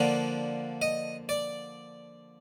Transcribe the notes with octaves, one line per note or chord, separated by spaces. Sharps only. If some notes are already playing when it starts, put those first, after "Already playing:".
Already playing: D3 F3 A#3 D4
D#5
D5